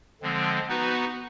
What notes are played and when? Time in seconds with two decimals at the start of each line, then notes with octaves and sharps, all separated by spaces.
0.22 D3 F3 G#3 C4
0.68 B3 D#4 F#4 B4